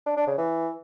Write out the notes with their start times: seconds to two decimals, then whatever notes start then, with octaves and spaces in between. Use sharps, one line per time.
0.06 D4
0.17 D4
0.27 C#3
0.38 E3